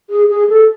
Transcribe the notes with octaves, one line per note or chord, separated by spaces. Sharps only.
G#4
G#4
A4